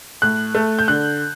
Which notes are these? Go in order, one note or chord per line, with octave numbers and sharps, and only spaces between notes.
A2 F#6
A3
G6
D3 F#6